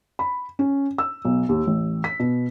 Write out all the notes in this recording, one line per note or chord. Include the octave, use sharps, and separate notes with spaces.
B5
C#4
E6
B1
D#2
A1
B6
B2